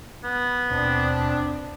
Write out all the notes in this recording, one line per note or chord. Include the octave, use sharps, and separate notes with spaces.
B3
D#2 B2 C4 D4